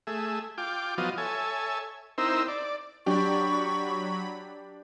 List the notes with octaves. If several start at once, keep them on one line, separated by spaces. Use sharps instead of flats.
A3 G#4 E5
F4 G5 D6
F3 F#3 B3 F4 D#5
A4 C#5 E5 G#5
C4 D#4 E4 A#4 C5 E6
D5
F#3 D4 G4 B5 C#6